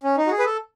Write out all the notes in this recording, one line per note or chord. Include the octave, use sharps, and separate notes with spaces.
C#4
D#4
F#4
G#4
B4
A4